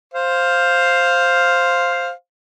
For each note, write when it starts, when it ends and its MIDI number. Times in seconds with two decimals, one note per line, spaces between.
0.14 2.11 72
0.14 2.11 77